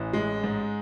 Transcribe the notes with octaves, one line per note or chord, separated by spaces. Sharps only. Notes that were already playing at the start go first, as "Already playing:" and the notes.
Already playing: A1 E3
G#3
G#2